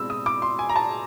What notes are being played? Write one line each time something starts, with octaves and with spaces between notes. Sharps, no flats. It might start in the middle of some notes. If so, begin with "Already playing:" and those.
Already playing: B2 G#3 C4 E6
D#6
D6
C6
G#5
A#5
A5